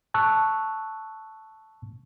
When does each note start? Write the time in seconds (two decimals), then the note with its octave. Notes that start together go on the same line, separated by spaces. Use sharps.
0.14 A5 C#6 E6 F#6